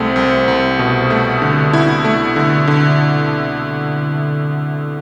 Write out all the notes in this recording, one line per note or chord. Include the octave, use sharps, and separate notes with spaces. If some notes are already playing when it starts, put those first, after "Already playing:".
Already playing: C2 A3 C4
C2
C2
B2
A3
D3
E4
A3
D3
D3